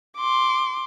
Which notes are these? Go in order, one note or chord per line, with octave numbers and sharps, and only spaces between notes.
C6 D6